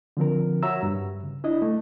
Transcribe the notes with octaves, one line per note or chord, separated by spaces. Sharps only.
D3 F3 C4 A#4
F#4 C#5 E5 F#5 A#5 E6
G2
C#3
D4 E4 D#5
A3